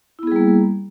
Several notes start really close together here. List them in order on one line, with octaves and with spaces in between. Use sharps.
E4 B3 G#4 G3 A#3